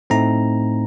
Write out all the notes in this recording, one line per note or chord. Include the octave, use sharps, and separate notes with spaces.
A2 A3 C4 D#4 A#5